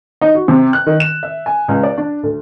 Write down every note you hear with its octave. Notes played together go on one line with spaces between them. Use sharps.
D#4
F#4
C3
F#6
D#3
E7
E5
G#5
C#2
D5
D4
D2